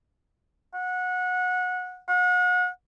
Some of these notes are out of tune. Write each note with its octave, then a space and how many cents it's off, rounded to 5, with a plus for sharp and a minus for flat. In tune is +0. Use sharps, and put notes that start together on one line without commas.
F#5 -20
F#5 -35